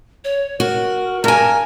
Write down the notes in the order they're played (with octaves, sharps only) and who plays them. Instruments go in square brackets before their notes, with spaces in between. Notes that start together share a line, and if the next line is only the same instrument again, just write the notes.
[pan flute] C#5
[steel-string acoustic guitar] F#4 [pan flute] A#4
[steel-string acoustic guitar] G2 G#5 [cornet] A#4 [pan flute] A5